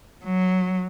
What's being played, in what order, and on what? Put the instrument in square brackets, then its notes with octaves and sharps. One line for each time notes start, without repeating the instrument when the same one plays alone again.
[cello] F#3